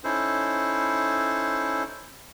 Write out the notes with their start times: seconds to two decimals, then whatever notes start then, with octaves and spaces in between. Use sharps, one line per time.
0.04 C#4 D#4 E4 A4 C5